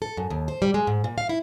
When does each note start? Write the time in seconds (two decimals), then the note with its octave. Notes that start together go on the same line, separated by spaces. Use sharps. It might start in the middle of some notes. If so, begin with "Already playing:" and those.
0.02 A4
0.17 F#2
0.30 D#2
0.48 C5
0.62 G3
0.74 G#3
0.87 G#2
1.04 A#2
1.18 F5
1.29 E4